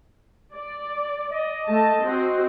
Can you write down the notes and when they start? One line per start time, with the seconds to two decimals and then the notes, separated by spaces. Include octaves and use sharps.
0.54 D5
1.31 D#5
1.67 A3 A5
2.02 C4 F#4 C5